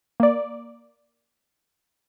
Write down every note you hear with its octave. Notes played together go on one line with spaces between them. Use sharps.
A#3 D5